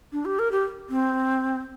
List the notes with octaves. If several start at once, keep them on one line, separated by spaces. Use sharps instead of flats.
D4
G4
A#4
G4
C4